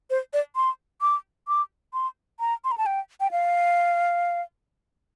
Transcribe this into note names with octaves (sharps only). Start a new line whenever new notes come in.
C5
D5
C6
D6
D6
C6
A#5
C6
A#5
A5
G5
G5
F5